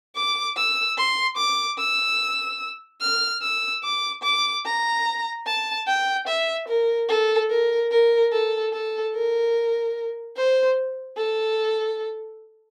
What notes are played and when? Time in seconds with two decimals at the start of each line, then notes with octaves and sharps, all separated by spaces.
0.16 D6
0.57 E6
0.97 C6
1.37 D6
1.78 E6
3.01 F6
3.42 E6
3.83 D6
4.23 D6
4.65 A#5
5.46 A5
5.87 G5
6.27 E5
6.68 A#4
7.09 A4
7.50 A#4
7.91 A#4
8.32 A4
8.73 A4
9.14 A#4
10.37 C5
11.17 A4